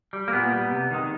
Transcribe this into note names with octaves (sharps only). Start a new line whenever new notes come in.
G3
A#3
A#2 B3
G3
C3
D#3 G#3